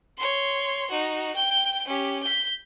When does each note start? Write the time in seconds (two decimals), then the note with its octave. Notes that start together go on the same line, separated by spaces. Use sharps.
0.18 C#5 C6
0.90 D#4 F#4
1.35 G5 G6
1.88 C#4 G4
2.23 G6 B6